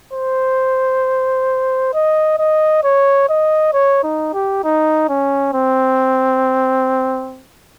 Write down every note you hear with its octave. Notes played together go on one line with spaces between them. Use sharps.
C5
D#5
D#5
C#5
D#5
C#5
D#4
G4
D#4
C#4
C4